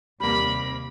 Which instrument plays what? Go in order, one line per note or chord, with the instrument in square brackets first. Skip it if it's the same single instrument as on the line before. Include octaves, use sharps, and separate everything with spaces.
[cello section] D#2 C3 [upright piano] G3 A#3 [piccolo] B5